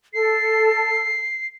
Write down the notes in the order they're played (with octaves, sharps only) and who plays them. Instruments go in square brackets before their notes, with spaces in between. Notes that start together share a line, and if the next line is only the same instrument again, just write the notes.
[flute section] A4 [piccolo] C7